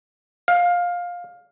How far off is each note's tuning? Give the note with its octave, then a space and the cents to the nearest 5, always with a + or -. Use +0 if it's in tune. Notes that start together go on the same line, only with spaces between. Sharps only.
F5 +15